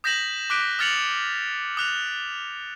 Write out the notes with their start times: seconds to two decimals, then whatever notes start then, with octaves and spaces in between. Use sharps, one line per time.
0.04 D#6 G6 A#6 B6 E7 F#7
0.50 D6 F#6 B6 D7
0.79 D#6 F6 A6 C#7 F7 F#7
1.77 D#6 F#6 F7